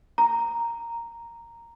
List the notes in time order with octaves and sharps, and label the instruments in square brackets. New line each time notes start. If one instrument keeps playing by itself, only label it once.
[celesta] A#5